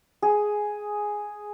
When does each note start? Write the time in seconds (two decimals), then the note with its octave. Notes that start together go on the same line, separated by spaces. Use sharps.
0.22 G#4